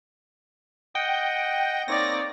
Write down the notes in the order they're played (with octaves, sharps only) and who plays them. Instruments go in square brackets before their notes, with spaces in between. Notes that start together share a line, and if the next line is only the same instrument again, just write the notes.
[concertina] D#5 F#5 D#6 [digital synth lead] G5
[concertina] A#3 C4 C#5 [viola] D#4 D5 [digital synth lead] A#6